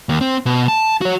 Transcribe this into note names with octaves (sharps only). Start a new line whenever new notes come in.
D#2
C4
B2
A5
F#4 C#5